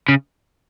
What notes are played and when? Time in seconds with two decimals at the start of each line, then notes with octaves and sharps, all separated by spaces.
0.09 C#3